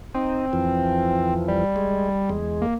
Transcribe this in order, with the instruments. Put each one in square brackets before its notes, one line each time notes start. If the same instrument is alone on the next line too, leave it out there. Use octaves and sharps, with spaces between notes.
[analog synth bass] C4 [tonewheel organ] D#4
[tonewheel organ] F2 E3 F3
[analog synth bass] G3
[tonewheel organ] G#3
E2 G#3
[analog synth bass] A#3